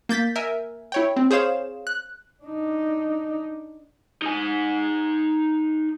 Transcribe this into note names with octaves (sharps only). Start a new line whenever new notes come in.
A#3 G6 A6 B6
A#4 E5 G#5
E4 C#5 G5
C4
G#4 C5 C#5 F5 E7
F#6
D4 D#4
D#4 G#5